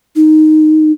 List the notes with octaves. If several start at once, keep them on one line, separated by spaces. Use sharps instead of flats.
D#4